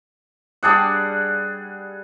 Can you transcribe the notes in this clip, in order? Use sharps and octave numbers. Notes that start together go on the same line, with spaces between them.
G3 D4 G#4 F#5